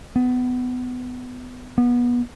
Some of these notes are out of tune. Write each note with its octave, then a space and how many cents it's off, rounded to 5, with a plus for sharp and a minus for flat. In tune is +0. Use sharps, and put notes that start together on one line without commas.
B3 +20
B3 -25